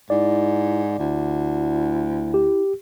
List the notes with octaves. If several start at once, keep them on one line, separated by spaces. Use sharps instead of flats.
G#2 E4 D5
D2 E4
G4